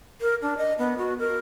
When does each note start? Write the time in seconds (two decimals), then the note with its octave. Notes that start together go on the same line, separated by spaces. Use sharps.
0.21 A#4
0.42 D4
0.58 D#5
0.79 B3
0.98 F#4
1.19 A#4